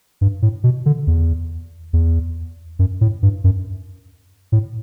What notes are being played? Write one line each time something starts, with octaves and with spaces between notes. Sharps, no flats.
G2
A2
B2
D3
E2
E2
F#2
A2
G2
F#2
A2